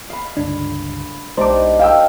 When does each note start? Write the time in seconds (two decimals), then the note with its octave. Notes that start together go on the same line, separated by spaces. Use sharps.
0.10 F5 B5
0.37 C#2 G2 D3 D4
1.37 B1 G#3 D4 D#4 G4 C5 D6
1.79 F5 G5 E6